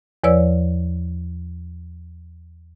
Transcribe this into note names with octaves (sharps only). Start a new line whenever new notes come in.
E2 F3 B4 C#5 D5 E6